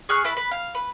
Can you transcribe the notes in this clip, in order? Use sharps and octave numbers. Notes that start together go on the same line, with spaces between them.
G#4 C#6 F6 F#6
E4 B4 A5
B4
F5
B4